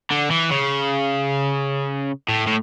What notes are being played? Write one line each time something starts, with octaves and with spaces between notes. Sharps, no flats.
D3
E3
C#3
A2
A2